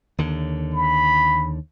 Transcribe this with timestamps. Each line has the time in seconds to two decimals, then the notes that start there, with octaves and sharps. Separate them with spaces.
0.18 D#2 D3
0.74 B5